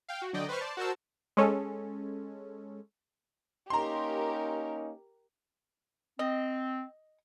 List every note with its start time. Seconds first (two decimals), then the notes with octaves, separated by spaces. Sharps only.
0.09 F5 G5
0.22 F#4
0.33 D3 F#3 D5 D#5 G5
0.49 B4 C5 B5 C#6 F6
0.61 C5 D5 A5
0.77 F#4 A#4 C5 A5 E6
1.37 G#3 C#4 A4
3.70 A#3 C#4 D#4 G4 A#4 A#5 C6
6.19 C4 D#5